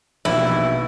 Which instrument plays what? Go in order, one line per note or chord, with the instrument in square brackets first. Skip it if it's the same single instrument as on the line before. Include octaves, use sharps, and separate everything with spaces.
[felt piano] A#1 D#2 B2 [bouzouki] E4